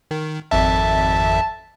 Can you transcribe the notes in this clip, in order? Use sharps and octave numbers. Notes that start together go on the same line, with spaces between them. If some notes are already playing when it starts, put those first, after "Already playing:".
D#3
G#1 F2 E5 A5